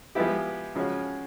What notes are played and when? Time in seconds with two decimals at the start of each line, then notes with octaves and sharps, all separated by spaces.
0.15 F3 G#3 B3 E4 G4
0.76 C#3 F3 G#3 C#4 F#4